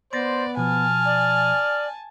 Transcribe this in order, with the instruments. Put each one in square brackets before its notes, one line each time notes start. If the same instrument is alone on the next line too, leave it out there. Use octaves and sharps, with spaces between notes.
[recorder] B3 [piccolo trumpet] C5 [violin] D5 [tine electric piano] C6 A6 A#6
[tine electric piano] B2 F3 [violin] G#5 A5 [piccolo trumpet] F6
[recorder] D5